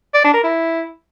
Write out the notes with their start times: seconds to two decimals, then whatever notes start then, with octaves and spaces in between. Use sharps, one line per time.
0.14 D5
0.24 D4
0.34 A#4
0.44 E4